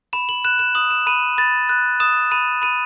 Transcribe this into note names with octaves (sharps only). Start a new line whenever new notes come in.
B5 E7
F#7
F#6 E7
E7
D#6 F#7
E7
B5 D#7
B5 A6
F#6
D#6 E7
B5 D#7
B5 D#7